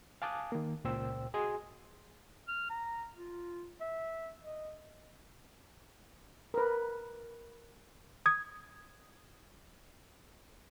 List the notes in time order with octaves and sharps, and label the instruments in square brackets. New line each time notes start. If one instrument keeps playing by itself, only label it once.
[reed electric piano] F5 G#5 A5 D6 D#6 F#6
D#3 A#3
C#2 A#2 C5 G5 E6
F#4 G#4 D#5 G#5 C6 D#6
[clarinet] F6
A#5
F4
E5
D#5
[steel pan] A#4 B4
[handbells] D#6 G#6